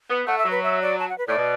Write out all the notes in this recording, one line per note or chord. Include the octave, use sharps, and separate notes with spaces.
B3
A3 F#5
E5
F#3
B4
E5
D5
A5
F#5
B4
A2 D5
B2